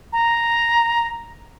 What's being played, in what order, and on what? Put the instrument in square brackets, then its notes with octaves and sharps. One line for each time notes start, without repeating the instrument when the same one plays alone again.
[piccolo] A#5